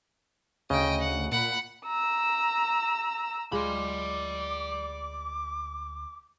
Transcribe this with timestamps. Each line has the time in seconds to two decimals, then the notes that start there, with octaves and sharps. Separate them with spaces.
0.70 D2 C#3 D#5 G5
1.01 F#5
1.32 A#2 F#5 B5
1.87 A#5 E6
3.52 D2 G#3 F4 D5 B5 D6